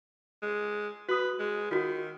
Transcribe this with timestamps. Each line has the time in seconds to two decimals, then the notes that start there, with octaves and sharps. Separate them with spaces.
0.42 G#3
1.09 F#4 B4 D#6
1.39 G#3
1.71 D#3 F4 F#4